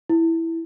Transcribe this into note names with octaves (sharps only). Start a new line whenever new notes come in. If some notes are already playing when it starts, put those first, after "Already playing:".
E4